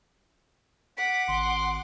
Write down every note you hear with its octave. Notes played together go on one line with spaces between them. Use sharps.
F#5 D6 B6
G#1 C6